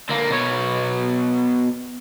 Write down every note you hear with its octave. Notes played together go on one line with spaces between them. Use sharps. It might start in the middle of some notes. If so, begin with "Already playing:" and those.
D3 A#3
B2 C#5